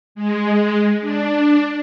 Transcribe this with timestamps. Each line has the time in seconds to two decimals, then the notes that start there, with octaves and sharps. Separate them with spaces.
0.15 G#3
1.01 D4